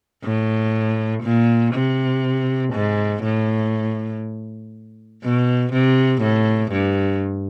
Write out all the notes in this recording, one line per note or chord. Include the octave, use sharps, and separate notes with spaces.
A2
A#2
C3
G#2
A2
B2
C3
A2
G2